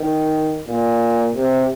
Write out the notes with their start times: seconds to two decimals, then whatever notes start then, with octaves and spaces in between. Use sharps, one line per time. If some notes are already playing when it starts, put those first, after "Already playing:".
Already playing: D#3
0.68 A#2
1.34 C3